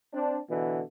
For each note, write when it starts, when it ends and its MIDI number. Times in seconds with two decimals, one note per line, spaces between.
0.14 0.38 60
0.14 0.38 62
0.49 0.81 47
0.49 0.81 50
0.49 0.81 52